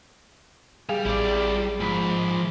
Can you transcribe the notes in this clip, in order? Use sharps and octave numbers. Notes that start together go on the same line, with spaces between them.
G3 G#4 F5 G#5
A1 E4 D5
G#2 F3 B5